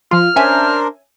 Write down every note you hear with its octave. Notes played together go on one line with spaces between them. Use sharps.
F3 F4 F6
C#4 D4 A#4 C5 E5 G#5